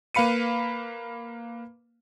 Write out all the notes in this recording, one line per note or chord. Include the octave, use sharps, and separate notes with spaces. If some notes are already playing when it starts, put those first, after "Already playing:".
A#3 B4 F5 B5 C#7 D#7